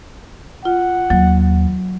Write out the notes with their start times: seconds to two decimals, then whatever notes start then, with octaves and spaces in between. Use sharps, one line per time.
0.65 F4 F#5
1.10 D#2 F#3